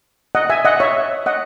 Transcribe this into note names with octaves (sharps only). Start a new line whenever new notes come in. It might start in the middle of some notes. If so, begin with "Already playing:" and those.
D#5 F#5
E5 G#5
D#5 F#5
C#5 E5
D#5 F#5